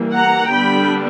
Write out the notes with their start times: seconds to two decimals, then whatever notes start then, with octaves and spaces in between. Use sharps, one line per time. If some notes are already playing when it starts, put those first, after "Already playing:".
Already playing: E3 G3 A#3
0.15 F#5 A#5
0.51 D3 G3 B3 D4 G5 B5